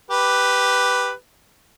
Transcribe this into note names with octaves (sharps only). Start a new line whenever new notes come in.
G4 B4